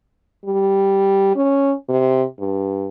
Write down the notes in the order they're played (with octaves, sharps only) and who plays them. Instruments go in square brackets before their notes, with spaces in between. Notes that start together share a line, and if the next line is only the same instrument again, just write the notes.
[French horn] G3
C#4
C3
G2